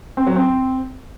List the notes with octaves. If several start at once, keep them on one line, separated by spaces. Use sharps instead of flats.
C4
F#3
C4